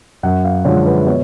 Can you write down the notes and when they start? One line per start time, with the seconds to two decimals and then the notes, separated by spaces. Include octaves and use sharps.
0.23 F#2 F#5
0.44 F5
0.65 D3 F3 G#3 C#5
0.86 B4
1.06 B2 C#5